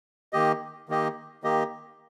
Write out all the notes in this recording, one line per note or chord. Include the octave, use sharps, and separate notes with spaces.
D#3 A#3 G4 D#5
D#3 A#3 G4 D#5
D#3 A#3 G4 D#5